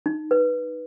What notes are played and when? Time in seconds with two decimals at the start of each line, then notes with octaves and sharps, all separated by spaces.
0.06 D#4
0.31 B4